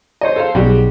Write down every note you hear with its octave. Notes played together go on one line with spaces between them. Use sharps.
C5 C#5 D#5
A4 C5 F5
B1 G3 G#3 F#4